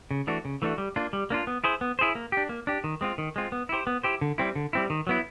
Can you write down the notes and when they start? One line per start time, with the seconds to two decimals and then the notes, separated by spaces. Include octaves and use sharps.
0.11 C#3
0.27 E3 A3 D4 F#4
0.45 C#3
0.62 E3 A3 D4 F#4
0.78 G3
0.96 A#3 D4 F4
1.13 G3
1.30 A#3 D4 F4
1.47 B3
1.64 E4 G#4 C5
1.81 B3
1.99 E4 G#4 C5
2.15 A#3
2.32 D4 G4
2.49 A#3
2.67 D4 G4
2.84 D#3
3.01 G#3 C4 F4
3.18 D#3
3.36 G#3 C4 F4
3.52 B3
3.69 E4 G4 C5
3.87 B3
4.03 E4 G4 C5
4.21 D3
4.38 G3 C4 E4
4.56 D3
4.73 G3 C4 E4
4.90 D#3
5.07 F#3 B3 E4